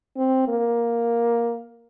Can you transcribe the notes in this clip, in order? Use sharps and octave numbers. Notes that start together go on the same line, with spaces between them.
C4
A#3